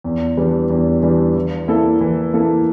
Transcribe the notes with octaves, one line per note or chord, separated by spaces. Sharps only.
E2
E3 G3 D4
E2
E3 G3 D4
E3
A#3 E4 A4
E3
A#3 E4 A4